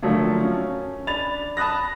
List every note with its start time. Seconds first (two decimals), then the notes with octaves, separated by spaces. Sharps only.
0.02 D3 F3 F#3 A3 A#3
0.43 C#4
1.07 D4 B5 A6 F7
1.57 A5 B5 D#6 F#6 A#6